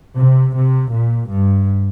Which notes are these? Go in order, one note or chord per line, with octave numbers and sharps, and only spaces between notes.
C3
C3
A#2
G2